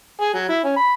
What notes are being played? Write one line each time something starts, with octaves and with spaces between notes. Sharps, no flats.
G#4
F#3
E4
C#4
B5